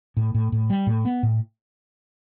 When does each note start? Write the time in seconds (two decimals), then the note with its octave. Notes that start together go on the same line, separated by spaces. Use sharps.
0.17 A2
0.34 A2
0.52 A2
0.70 G3
0.87 A2
1.05 B3
1.23 A2